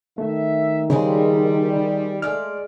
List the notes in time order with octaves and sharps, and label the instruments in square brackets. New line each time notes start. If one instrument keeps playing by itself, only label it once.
[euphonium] D#3 [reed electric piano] A3 [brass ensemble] E5
[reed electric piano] C#3 [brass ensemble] G3 [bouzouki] G#3 C4 G#4
[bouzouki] G#3 D5 [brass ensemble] A3 [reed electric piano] F6